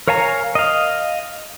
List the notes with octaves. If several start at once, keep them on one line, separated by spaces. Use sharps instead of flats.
A#4 C#5 F5 G#5 A#5
D#5 F5